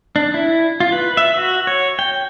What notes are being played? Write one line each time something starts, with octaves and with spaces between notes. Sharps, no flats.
D4
E4
F4
B4
E5
F#4
C#5
G5